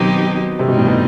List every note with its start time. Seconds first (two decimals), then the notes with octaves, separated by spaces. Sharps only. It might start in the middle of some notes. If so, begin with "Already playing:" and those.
Already playing: B2 D#3 F#3 C4 D#4 G4
0.59 G2 C3 D#3 G3 C4 D#4
0.68 B2
0.78 A2
0.87 B2